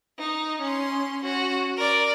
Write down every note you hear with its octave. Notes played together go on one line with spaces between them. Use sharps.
D#4
C#4 C6
C#4 F#4
A#4 D5